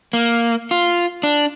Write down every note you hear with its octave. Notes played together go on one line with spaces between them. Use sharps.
A#3
F4
D4